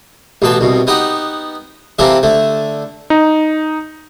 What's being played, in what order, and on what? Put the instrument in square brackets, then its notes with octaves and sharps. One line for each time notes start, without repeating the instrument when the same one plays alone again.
[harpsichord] A1 B2 B3 A5
C2 B2
B3 D#4 G4 F#5
C3 E3 A#3 C4 G4 A4
D3 A3
[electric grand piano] D#4